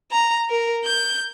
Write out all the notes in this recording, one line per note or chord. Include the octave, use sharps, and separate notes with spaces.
A#5
A#4
G6